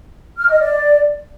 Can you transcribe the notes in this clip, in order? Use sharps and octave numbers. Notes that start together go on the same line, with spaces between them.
F6
D#5
D5